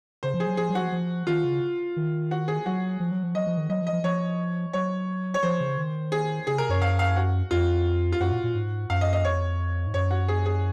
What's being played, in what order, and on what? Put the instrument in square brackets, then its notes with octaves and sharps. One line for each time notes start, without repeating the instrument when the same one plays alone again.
[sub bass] C#3 [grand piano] C5
[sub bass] F3
[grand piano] G#4
[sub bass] F#3
[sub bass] F3 [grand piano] G#4
[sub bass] F#3
[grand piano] F#4
[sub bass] F3
F3
[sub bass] D#3 [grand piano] F4
[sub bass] C#3
D#3
[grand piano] F#4
G#4
[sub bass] F#3 [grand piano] F#4
[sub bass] F3
F#3
F3
[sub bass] F#3 [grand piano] D#5
[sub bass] F3
D#3
[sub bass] F#3 [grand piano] D#5
[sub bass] F3
[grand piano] D#5
[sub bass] F3
[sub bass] F3 [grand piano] C#5
[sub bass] F#3 [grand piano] C#5
[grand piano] C#5
[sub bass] F3 [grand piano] C5
[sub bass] C#3
D#3
[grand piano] G#4
[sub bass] C#3 [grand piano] G#4
[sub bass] C3 [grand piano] A#4
[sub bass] F#2 [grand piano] C#5
[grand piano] F5
F5
F#4
[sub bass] F2 [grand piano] F4
[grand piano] F4
[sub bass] F#2 [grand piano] F#4
[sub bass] A#2
A#2
G#2
[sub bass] F#2 [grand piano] F5
[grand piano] D#5
D#5
[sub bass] F2 [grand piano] C#5
[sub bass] G#2
[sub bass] F#2 [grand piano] C#5
[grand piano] F#4
G#4
G#4